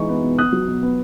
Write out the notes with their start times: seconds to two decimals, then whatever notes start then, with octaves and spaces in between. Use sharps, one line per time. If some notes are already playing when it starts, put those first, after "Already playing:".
Already playing: E3 G#3 D#4 C#6
0.09 B3
0.23 B2
0.38 B3 D#6 F#6
0.52 F#3
0.68 B2
0.82 B3